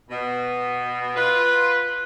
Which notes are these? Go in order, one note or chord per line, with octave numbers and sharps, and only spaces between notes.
B2
F4 B4